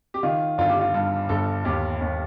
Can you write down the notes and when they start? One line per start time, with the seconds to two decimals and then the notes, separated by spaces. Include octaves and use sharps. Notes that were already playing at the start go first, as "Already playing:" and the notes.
0.14 G4
0.23 D#3 F4
0.58 G1 F4
0.69 G4
0.79 F4
0.94 G2
1.29 G1 A4
1.65 D#2 G4
2.01 D#2